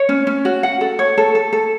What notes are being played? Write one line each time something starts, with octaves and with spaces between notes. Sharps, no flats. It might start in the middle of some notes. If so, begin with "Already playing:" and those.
Already playing: C#5
C#4
C#4
F#4
F#5
A4
C#5
A4
A4
A4